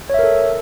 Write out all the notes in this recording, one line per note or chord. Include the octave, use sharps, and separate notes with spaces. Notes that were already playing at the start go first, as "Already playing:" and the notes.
A4 A#4 C#5 E5